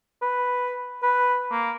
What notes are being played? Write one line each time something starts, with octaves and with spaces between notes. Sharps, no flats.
B4
B4
A#3